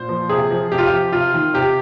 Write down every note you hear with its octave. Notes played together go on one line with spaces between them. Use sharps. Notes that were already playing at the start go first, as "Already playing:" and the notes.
Already playing: A#2 C5
F3
C3 G#4
F3
C3 G4
F4
G4
F3
C3 F4
D#3
C3 G4